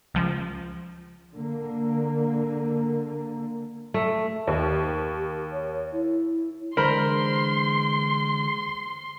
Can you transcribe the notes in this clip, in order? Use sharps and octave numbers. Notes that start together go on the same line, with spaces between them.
C#2 F3
D3 A#3
A3
D#2 G4
C#5
E4
D3 E3 G#3 A#4 C5 B5 C6